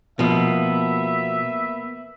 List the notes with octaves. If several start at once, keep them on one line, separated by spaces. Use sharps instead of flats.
B2 F3 A#3 B3 E5